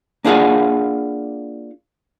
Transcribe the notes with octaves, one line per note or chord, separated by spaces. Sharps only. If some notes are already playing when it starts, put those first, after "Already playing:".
A#3 D4 F4 G#4 F5 F#5